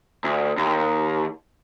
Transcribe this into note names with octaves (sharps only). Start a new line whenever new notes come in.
D2
D#2